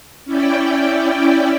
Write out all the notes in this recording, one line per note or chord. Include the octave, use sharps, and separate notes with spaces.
C#4 E4 D5 G5